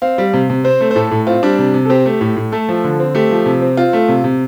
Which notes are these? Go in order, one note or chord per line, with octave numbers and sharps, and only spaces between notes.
C4 F5
G3
C3
C3
C4 C5
A3
C5
A2 A4
A2
C4 F4
G3 D4
C3
C3
A4
C4 G4
A3
A2
A2
A3 A4
F3
D3
C4
A3 G4
F3
C3
C4
C4 F4
A3
C3
C3